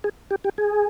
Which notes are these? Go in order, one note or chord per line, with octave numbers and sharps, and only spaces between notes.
G#4
G4
G4
G#4